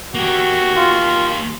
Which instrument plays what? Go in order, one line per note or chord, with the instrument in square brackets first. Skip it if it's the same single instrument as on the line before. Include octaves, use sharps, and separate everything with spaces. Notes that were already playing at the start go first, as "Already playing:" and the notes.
[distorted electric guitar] A#3 G4 [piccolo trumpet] F#4
[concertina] F4